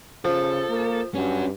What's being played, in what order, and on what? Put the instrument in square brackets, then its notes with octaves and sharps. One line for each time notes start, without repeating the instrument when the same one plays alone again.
[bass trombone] C#3 [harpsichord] F3 [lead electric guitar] A4
[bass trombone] A#3
[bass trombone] G2 [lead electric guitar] C#4 F#4